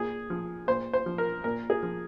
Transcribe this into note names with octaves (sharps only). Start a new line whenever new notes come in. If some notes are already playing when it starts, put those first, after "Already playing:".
Already playing: A#2 G#4
F3
A#2 C5
C5
F3
A#4
A#2 A#4
G#4
F3